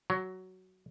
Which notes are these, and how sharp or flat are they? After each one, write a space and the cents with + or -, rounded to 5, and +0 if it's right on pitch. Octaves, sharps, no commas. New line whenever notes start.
F#3 +10